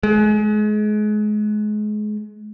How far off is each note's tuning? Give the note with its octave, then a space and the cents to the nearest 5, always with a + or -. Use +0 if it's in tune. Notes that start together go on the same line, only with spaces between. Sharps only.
G#3 +30